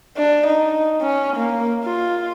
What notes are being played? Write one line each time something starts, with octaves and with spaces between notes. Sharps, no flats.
D4
D#4
C#4
A#3
F4